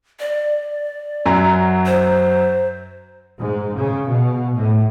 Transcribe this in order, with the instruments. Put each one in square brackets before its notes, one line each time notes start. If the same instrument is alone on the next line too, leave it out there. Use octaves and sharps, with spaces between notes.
[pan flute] D5
[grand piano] F#2 F#3 A#5
[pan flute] C5
[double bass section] G#2
C#3
B2
A2